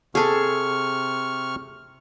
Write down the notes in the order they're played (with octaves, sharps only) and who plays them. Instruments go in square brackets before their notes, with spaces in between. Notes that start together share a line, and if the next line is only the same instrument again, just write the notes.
[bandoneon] C3 C#6 F6 [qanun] G#4 A4